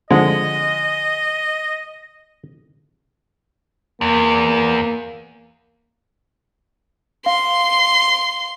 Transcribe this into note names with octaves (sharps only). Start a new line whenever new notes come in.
D3 F3 G#3 D#5 F#5
E2 A#3
F5 C6